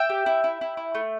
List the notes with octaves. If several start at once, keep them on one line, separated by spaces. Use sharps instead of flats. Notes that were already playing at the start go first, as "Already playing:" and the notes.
Already playing: E5 G5
G4
E4
E4
E4
E4
A3